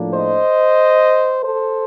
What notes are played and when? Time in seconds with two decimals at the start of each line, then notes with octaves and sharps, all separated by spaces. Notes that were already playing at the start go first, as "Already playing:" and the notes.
Already playing: A2 F3 A#3 D4
0.15 C5 D#5
1.44 A4 C5